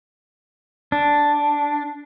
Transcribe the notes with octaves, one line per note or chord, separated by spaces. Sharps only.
D4